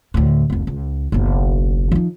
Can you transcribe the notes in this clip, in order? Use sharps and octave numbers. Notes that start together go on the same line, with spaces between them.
D2 A2
F1 C2
C#2
F#1 B1
F3 D#4